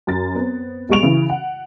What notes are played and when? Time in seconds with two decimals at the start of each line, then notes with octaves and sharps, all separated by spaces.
0.07 F#2 A6
0.35 B3 C4
0.89 B1 G3 G#3 C#6 D7 F7
1.03 C#3 E3 E4
1.30 F#5